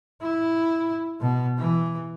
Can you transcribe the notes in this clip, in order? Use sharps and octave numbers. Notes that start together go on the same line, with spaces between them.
E4
B2
E3